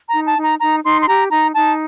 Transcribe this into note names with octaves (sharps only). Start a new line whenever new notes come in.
A#5
D#4
A5
D#4
A#5
D#4 A#5
D#4 C6
C6
G4 A#5
D#4 A#5
D#4 A5